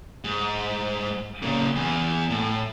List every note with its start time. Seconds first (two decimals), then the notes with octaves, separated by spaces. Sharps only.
0.24 G#2
1.42 A#2 C#3
1.76 E2
2.30 A2